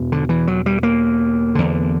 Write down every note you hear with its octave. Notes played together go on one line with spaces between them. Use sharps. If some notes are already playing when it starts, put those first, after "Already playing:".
Already playing: E2 B2
D3
E3
F#3
G3
A#3
E2 D3